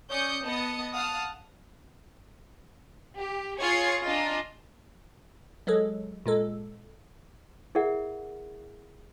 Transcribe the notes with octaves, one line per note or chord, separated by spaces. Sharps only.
C#4 D5 D#6 G6 C#7
B3 D#5 A5 D#6 C#7
F5 F#5 A5 D#6 F6
G4
F4 G#4 C#5 C#6 G#6 C7
D4 F4 D#5 G#5 A#5
F#3 G#3 G#4 A4
A#2 G#3 A4
E4 G#4 A#4 D5 E5 F#5